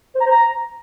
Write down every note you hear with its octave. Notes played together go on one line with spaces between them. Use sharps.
C5
A#5
C5
A#5